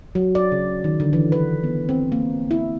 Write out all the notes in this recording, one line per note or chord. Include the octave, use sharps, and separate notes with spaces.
F#3
D5
C#3
D#3
D3
E3
B4
B3
C4
A#3
E4